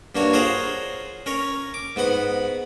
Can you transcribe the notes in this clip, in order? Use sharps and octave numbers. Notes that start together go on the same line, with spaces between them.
G2 A#3 D4 F#4 C#5
F4 G#4 A#4 C5 C#5 F#5
C#4 A#4 C#5
D6
G#2 B3 B4 F#5 B5